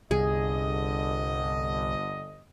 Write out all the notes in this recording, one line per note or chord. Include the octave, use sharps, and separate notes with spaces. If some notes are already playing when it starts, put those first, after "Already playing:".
G1 C2 D3 G#4 D#5